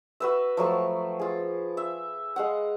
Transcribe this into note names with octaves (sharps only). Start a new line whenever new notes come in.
F#4 B4 E5
F3 F#3 A3 C#6
F4 G#4
E5
G#3 F5 F#5